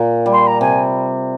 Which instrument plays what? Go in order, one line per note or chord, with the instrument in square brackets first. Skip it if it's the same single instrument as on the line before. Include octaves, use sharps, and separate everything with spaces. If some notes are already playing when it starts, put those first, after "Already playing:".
Already playing: [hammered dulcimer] A#2
G3
[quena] C6
A#5
[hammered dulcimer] C3 [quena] G#5